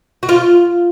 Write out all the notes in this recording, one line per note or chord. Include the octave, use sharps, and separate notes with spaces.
F#4
F4